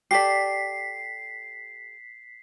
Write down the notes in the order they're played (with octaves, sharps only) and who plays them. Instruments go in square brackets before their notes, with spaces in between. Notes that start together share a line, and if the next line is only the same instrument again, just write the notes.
[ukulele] G4 A4 D5 [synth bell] B6 C7